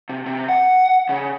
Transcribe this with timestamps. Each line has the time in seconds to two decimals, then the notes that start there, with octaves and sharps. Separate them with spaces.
0.09 C3
0.26 C3
0.49 F#5
1.09 C#3